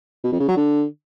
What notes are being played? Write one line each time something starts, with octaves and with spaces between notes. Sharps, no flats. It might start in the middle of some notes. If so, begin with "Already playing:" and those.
B2
F2
C#3
F#3
D3